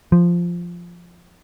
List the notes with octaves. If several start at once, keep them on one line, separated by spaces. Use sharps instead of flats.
F3